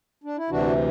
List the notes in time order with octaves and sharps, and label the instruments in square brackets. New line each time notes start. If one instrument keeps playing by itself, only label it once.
[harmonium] D4
E4
D2 C3 E3 D4 F#4